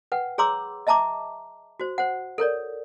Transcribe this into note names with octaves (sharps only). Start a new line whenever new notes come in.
B4 F#5 G5
G#4 C#5 A#5 C6 D6 E6
D#5 E5 A5 A#5 D6
F#4 C5
C5 F#5
A4 A#4 C#5 D5